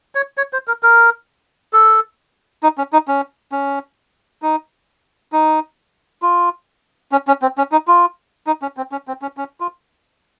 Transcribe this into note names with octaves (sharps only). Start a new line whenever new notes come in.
C#5
C#5
C5
A#4
A#4
A4
D#4
C#4
D#4
C#4
C#4
D#4
D#4
F4
C#4
C#4
C4
C#4
D#4
F4
D#4
C#4
C4
C#4
C4
C#4
C#4
F4